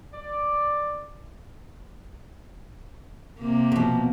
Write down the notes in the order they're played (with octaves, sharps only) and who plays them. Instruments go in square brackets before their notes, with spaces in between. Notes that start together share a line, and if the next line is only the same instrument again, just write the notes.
[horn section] D5
[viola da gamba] C3 A#3
[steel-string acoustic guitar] B2 F3